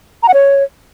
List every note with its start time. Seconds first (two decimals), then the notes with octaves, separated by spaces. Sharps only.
0.23 A#5
0.28 F#5
0.34 C#5